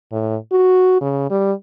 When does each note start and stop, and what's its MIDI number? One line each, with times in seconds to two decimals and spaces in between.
0.12 0.36 45
0.52 0.99 66
1.01 1.28 49
1.30 1.53 55